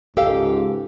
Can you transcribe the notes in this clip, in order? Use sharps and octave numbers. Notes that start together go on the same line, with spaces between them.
C#2 G#2 G4 A4 F5 A5